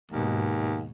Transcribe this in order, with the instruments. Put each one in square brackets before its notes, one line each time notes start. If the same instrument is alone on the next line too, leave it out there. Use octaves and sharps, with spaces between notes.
[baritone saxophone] D#2 [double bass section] G#2 B2